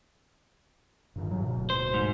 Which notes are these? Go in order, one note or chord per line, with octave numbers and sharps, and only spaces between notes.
G2 D#3
G#2 F#3
D1 B2
C5
G#2